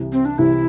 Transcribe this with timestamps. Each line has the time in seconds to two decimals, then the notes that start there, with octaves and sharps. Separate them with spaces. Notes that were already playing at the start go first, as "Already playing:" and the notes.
Already playing: C2 C3 E3
0.12 C4
0.25 D4
0.38 C2 C3 E3 E4